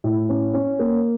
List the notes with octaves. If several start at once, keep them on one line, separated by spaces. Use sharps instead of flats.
A2
C#4
C#4
A#3